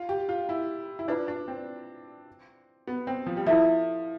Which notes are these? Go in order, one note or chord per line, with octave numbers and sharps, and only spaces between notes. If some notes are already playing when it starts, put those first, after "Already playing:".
Already playing: F4
G4
F4
E4
E4
D4 F4 B4 D5
D4
C4
B3
C4
F3
G3
F3 E4 A4 E5